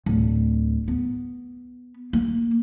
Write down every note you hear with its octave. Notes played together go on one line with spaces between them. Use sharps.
D1
B3
A#3